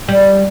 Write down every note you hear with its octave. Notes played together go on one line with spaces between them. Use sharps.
G3